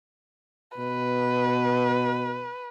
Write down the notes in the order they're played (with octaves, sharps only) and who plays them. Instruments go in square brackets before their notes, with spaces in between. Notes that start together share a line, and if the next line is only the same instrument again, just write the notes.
[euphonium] B2 [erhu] B4